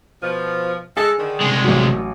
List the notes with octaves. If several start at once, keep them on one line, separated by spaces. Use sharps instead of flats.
B2 F3
G#3 G#4 A4
D3 D#3
C2 G#3
A1 F#3